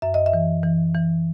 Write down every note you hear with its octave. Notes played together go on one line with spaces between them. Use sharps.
F#2 E5
D#5
E5
E3
E3
E3